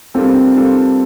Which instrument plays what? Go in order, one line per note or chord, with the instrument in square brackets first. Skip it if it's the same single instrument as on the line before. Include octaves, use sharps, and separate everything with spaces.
[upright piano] G3 A#3 D4 F4 A4 [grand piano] C4
[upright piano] G3 A#3 D4 F4 A4